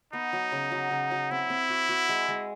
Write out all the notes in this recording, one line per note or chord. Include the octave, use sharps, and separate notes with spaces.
B3 D#4
F#3
C#3
F#3
C#3
F#3
C4 E4
C4
F#4
F#4
G#3
G#3